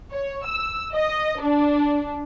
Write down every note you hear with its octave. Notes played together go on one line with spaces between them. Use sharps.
C#5
E6
D#5
D4